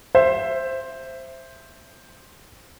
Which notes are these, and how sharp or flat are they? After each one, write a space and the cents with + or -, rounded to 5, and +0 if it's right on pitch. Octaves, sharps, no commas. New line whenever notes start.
C5 +5 E5 +10